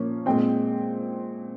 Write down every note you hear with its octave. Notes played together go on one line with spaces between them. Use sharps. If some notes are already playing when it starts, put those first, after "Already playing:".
Already playing: A#2 F3 A#3 C#4
A#2 G#3 C4 G5